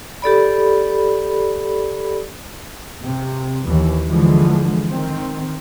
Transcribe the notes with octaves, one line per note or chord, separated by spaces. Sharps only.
G4 A4 D5 B5
C3
D#2 E3
D3 E3 F3 G#3
D#3 C4